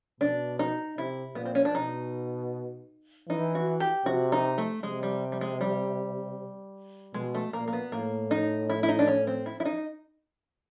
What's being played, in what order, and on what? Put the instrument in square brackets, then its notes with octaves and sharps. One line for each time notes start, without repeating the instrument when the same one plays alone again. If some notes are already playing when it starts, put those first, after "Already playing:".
[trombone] B2 [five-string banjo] D4
[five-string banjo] D#4
[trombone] C3 [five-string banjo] E4
[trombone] A#2 [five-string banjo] B3
[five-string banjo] C4
C#4
D4
[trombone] B2 [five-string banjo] D#4
[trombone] E3 [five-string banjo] D#4
[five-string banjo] F#4
G4
[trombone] C3 [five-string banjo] F#4
[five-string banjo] D#4
A3
[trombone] C3 [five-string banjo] G#3
[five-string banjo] G3
G3
G#3
G3
[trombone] B2 [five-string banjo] G#3
[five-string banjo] A3
[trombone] A#2 [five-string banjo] A#3
[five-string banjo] A#3
B3
[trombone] A2 [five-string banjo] A#3
[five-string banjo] D#4
E4
E4
D#4
D4
C#4
C4
E4
E4
D#4